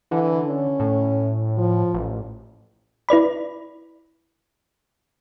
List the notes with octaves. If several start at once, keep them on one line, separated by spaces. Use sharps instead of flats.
D3 E3
C#4
A2
F3
A1
E4 B4 D5 B5